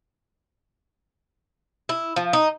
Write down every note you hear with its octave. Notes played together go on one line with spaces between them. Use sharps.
E4
F3
D#4